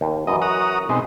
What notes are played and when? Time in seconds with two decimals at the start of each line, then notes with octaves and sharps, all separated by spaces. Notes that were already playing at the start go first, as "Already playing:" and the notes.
0.01 D#2
0.27 F#2 E3 D#5
0.42 F#4 A#5 D#6
0.89 B2 G#3 C4 D#4